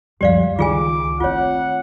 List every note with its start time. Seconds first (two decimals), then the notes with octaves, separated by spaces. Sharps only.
0.21 C#2 F#2 D3 F3 G3 G4 D5 F5
0.59 D#3 F4 G#4 G#5 D6
1.20 A3 C4 F4 C#5 F#5